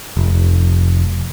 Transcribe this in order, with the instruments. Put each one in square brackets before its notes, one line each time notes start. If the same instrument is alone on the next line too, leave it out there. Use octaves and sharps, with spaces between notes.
[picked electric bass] F1